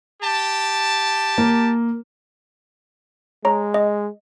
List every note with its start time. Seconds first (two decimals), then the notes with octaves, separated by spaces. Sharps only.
0.23 G4 A5
1.38 A#3
3.45 G#3 C#5 A#5
3.74 D#5